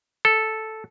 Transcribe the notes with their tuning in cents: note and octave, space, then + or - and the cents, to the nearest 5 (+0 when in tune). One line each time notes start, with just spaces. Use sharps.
A4 -5